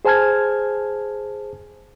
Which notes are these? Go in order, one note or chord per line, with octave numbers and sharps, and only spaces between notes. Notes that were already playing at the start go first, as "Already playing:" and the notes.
G#4 C5 G#5 A5 F6 G#6